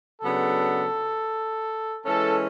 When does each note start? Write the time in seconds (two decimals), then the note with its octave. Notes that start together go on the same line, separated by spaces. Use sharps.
0.22 C#3 F#3 B3 D4 A4
2.05 E3 G#3 C#4 A4